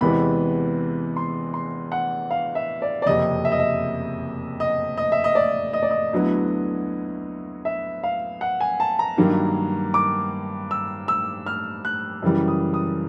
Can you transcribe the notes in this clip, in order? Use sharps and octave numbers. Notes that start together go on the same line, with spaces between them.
E2 C3 E3 G#3 B3 B5
C6
C6
F#5
F5
E5
D5
D5
F#1 F2 C3 D#5
E5
D#5
E5
D#5
D#5
E5
D#5
D5
D#5
D5
D#5
D2 D3 F#3 B3 E4
E5
F5
F#5
G#5
A5
A#5
G2 D#3 F#3 A#3
D6
E6
E6
F6
F#6
F#2 C#3 E3 G3
D#6
D#6